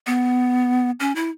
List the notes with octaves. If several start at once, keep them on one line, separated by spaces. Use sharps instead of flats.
B3
C#4
E4